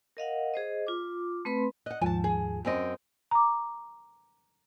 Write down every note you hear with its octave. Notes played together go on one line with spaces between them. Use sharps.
A#4 D#5 F5 F#5
G#4 C5 D#5
F4 D6
A3 C4 B4 B5 C6
D#5 F#5 F#6
D#2 G#2 F3 G#5 A5
G#4
F#2 C4 D#5
A#5 D6